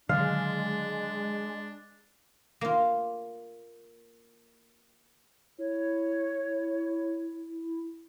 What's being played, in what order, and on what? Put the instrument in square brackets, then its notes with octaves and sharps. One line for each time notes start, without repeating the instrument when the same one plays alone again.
[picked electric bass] D3 D#3 F#3 [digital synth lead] G#3 [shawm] D4 [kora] F5
[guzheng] A#3 F4
[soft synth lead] E4 [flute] C#5